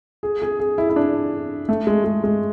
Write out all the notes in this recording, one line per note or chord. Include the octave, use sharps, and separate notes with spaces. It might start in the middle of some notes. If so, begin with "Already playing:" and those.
G#4
G#4
G#4
E4
E4
D4
A3
G#3
G#3
G#3